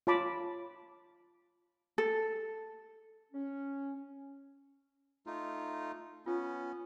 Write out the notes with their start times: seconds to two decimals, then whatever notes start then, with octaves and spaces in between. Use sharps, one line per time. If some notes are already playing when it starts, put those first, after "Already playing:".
0.07 F4 C#5 A5 B5 D6
1.98 A4
3.33 C#4
5.27 A3 D#4 F4
6.26 B3 C#4 F4